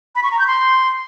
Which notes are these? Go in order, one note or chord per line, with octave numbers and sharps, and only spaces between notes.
B5
C#6
A#5
G6
C6